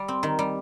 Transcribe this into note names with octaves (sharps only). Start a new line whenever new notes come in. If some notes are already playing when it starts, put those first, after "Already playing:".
Already playing: G3
C4
D#3
G3